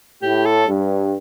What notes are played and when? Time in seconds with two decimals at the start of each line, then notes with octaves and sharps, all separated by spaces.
0.22 A2 G4
0.45 A4
0.68 G2